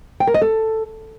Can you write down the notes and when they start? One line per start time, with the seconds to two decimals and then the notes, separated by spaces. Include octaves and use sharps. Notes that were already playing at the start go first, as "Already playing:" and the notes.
0.20 G5
0.27 A#4
0.34 D#5
0.42 A4